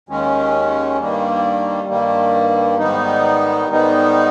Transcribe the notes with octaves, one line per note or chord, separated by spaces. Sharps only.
D#2 D#3 G#3 C#4
G2 D#3 G3 A#3
G2 D#3 G3 A#3
G#2 D#3 G3 B3 D#4
G#2 D#3 G3 B3 D#4